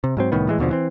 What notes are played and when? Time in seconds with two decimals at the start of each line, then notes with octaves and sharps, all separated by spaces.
0.04 C3
0.17 G#2 F#3 C4
0.32 C2 A2 D#3 B3
0.47 A2 E3 G#3
0.59 D#2 B2 D3 F3
0.70 E3 C4